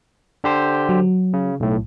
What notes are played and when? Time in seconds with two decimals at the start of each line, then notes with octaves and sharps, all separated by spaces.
0.44 D3 G4 C5
0.89 F#3
1.33 C#3
1.60 B1 A2